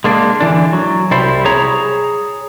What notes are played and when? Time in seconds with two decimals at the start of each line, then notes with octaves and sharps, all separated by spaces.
0.04 G#3 A#3 D4
0.41 D3 E3 D4
0.73 F#3
1.11 C2 G3 E4 C5
1.45 G#4 C#5 A#5